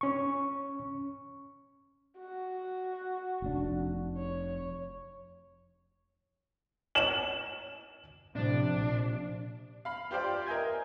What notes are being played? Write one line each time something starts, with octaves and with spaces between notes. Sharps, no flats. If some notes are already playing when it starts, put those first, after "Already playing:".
C#4 C#6
F#4
F1 D4
C#5
E7 F#7
A2 C3 F3 D4
A#1
F5 B5
F4 G4 C5 D5 G5
A#4 D#5 E5 G#5 G6 G#6